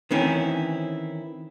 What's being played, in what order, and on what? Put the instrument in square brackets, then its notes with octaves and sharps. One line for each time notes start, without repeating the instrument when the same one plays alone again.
[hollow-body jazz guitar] D#3 E3 C4 C#4 E4